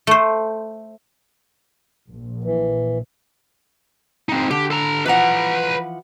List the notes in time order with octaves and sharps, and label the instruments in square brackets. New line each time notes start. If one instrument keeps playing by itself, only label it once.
[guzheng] A3 C5
[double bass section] A#1
[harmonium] E3
[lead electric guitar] C4 D#4
[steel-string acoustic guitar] D3 [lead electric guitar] G4
[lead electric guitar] A4 A#5
[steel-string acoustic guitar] E3 F3 F#5 [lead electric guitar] B4 A#5